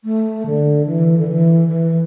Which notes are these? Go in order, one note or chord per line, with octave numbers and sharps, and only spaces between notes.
A3
D3
E3
D3
E3
E3